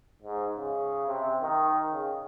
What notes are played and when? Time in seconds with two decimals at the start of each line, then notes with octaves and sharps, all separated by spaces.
0.22 G#2
0.57 C#3
1.07 C3
1.42 D#3
1.93 C#3